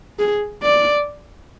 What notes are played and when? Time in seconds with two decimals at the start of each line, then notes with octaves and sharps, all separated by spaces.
0.19 G#4
0.63 D5